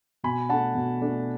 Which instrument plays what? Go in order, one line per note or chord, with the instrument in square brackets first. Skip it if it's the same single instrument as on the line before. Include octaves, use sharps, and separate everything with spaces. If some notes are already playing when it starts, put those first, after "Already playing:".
[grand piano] B2 G#5 B5
A3 D4 F#5 A5
B2
A3 D4